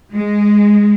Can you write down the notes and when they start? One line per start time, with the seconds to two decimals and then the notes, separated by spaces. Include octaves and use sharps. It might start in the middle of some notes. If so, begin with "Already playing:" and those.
0.12 G#3